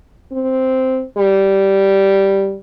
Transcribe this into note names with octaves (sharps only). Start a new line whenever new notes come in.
C4
G3